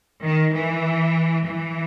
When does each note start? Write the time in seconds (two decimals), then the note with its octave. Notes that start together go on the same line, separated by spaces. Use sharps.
0.23 D#3
0.54 E3
1.46 E3